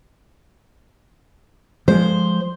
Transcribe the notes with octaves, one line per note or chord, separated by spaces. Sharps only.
F3 G#3 C5